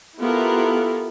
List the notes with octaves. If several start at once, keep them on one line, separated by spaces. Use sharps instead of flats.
B3 E4 F4 G4 A4 A#4